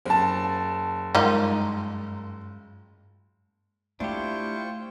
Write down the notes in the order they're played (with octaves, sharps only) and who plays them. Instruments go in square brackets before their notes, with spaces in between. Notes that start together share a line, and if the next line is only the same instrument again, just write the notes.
[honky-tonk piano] F#1 A5 [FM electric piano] C5
[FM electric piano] G2 G#3 [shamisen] D#3 D#4 F4
[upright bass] A3 [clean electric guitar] D4 G4 [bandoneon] E4 C5 [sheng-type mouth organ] F4 G5 C#6